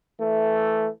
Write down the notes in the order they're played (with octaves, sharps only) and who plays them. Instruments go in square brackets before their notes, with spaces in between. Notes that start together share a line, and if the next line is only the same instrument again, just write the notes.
[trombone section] E3 A3